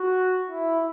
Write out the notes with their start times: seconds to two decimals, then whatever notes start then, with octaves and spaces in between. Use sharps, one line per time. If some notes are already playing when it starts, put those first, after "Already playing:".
Already playing: F#4
0.50 E4